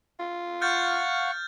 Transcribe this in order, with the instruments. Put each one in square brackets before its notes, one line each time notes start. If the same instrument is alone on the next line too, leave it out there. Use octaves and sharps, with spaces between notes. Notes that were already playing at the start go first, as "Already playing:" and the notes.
[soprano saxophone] F4
[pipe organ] F5 F#5 C#6 [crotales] F6 G6 A6